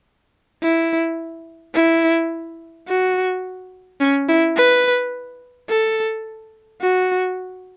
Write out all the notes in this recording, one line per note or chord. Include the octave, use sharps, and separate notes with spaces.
E4
E4
F#4
C#4
E4
B4
A4
F#4